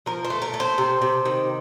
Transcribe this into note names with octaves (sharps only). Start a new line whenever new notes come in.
F3 A#4
C5
A3
A#4
A3
C5
C3
C3
D#3